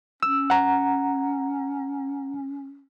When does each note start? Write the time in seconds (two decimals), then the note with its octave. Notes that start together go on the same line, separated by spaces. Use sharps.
0.23 C#4 E6
0.50 F#5 A#5